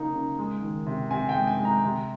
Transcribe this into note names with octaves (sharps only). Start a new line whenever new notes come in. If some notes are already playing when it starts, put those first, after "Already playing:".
Already playing: C#3 A#3 D#4
C#3
G#3
D#3
C3
C3 G#5
G5
G#3
G#5
G#3
A#5
C3